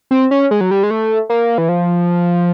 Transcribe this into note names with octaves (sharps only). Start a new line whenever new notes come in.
C4
C#4
G#3
F#3
G3
G#3
A3
A#3
E3
F3